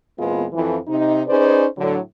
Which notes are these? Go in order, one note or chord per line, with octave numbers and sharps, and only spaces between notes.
E2 A#2 G#3 B3 C4 F4
F2 E3
C3 D#4
C#4 D#4 G#4 B4 C5 D5
A2 D3 F#3